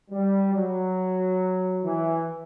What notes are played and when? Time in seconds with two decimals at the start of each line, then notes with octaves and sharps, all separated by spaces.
0.11 G3
0.53 F#3
1.83 E3